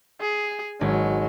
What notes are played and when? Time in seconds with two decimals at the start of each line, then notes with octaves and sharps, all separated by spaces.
0.21 G#4
0.81 G#1 F#3